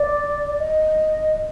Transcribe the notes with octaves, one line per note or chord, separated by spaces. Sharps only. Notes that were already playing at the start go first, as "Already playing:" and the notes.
Already playing: D5
D#5